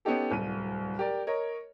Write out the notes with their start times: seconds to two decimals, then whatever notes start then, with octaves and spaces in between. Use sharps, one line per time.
0.05 B3 C#4 D#4 G4 A4
0.30 D1 C2 D#7
0.99 G4 A#4 D5
1.27 A#4 C#5 D#5